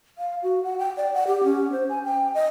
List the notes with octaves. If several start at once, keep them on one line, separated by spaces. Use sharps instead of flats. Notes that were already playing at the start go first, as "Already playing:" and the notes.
F5
F#4
F#5
G5
D5
F#5
G4
C#4
C5
G#5
G5
D#5